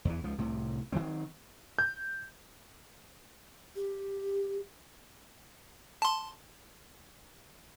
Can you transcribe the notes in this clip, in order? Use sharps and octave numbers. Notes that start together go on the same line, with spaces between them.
E2 E3
C#2 F3
C2 A2 C3
D#3 E3 F#3 C4
G6
G4
A5 C6